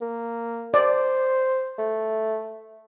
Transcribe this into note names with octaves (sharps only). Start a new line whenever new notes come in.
A#3
C5 D5
A3